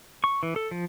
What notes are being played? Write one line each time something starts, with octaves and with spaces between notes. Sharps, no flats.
C#6
E3
A4
F3